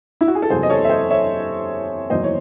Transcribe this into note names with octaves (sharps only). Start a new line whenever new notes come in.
E4
F#4
G#4
A4
F#1 E2 C3 F#3 G#4 C5
D#5
A4 C#5
E5
C5 D#5
C#5 E5
F#1 E2 D#3 F#3 C5 D#5
C#5